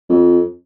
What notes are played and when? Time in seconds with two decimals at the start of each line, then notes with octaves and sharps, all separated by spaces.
0.09 F2